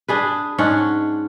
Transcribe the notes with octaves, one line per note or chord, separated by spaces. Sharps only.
D4 G#4 B4
G#2 C#4 D4 F#5